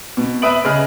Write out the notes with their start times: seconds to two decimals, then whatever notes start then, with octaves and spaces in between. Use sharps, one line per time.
0.17 B2
0.42 B4 E5 D#6 D7 F#7
0.64 C#3 G#4 B4 D#5 F6